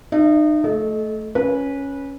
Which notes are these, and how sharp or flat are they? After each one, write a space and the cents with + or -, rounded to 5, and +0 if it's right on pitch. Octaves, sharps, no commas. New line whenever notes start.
D#4 -35 E5 +25
A3 +0 A4 -30 D#5 +0
C#4 +0 B4 -20